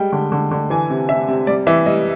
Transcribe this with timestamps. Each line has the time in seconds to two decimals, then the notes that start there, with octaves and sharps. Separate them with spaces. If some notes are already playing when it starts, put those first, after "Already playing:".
Already playing: G3 G#3 G5
0.13 D3
0.32 D3
0.51 D3
0.70 E3 G#5
0.90 C3
1.09 C3 E5
1.28 C3
1.47 G3 D5
1.67 E3 E5
1.86 G3 D#5